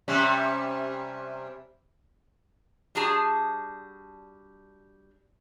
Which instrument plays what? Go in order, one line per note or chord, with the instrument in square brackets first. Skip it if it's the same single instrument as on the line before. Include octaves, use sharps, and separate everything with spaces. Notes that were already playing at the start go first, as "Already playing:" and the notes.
[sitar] C3 G3 C#4
[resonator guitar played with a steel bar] G3 D4 F#4 G#4 A5